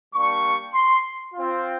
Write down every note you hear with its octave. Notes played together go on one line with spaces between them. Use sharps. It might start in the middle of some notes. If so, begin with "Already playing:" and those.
G3 A#3 D4 C#6
C6
C4 F4